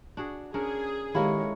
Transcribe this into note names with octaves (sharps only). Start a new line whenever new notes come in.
D4 F#4 G#4
C#4 D4 G#4 A#4
D#3 G#3 E4 G4 A4 A#4 C#5 F5